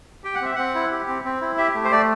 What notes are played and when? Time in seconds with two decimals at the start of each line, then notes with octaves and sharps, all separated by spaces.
0.24 G4 G5
0.35 F#5
0.42 C4 E5
0.56 C4 F#5
0.75 E4
0.91 G4
1.08 C4
1.25 C4
1.41 E4
1.57 G4 E5
1.75 A3
1.84 C5
1.92 A3 D5